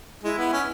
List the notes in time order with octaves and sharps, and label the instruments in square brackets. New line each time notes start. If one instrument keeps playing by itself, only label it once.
[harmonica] G#3 [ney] E4
[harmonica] B3
C#4